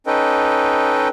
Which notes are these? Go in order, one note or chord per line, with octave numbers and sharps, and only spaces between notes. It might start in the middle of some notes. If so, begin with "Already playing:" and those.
C#4 D#4 A4 B4 D#5 G5